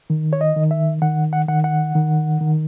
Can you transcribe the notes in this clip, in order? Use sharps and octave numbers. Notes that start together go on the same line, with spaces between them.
D#3
C#5
D#5
D#3
E5
D#3 F#5
F#5
D#3 F#5
F#5
D#3
D#3